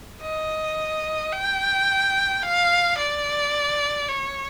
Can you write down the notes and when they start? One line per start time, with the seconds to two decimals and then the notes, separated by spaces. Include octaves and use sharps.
0.22 D#5
1.32 G5
2.43 F5
2.98 D5
4.09 C#5